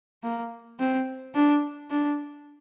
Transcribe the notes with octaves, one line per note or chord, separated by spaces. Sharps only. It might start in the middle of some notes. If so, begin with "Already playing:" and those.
A#3
C4
D4
D4